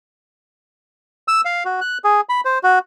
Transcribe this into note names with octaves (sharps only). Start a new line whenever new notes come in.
E6
F5
F#4
F#6
G#4
B5
C5
F#4